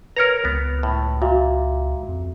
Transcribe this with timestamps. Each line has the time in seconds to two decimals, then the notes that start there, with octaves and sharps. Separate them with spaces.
0.16 A#4 B4 C#5 A#5 F6
0.45 C#2 B3
0.83 A2
1.22 A#2 F#4 E5
2.08 F2